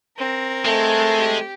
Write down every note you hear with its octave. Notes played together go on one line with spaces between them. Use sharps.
C4 A#4
G#3 A3
G4